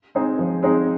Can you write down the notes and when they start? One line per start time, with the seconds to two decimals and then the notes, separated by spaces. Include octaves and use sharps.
0.15 G#3 C4 D#4 G#4
0.39 F3
0.63 G#3 C4 D#4 G#4